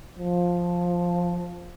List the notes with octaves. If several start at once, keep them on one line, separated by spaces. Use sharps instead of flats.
F3